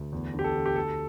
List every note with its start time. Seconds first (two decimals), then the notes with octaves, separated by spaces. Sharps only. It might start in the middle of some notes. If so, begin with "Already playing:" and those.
Already playing: D2
0.12 E2
0.34 D3
0.39 G4
0.44 A4
0.55 D3
0.66 G4
0.76 D2 A4